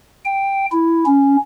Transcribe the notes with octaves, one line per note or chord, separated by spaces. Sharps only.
G5
E4
C#4